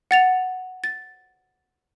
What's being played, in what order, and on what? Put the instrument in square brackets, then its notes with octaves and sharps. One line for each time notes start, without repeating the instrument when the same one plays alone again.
[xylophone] F#5 A6 F7
A6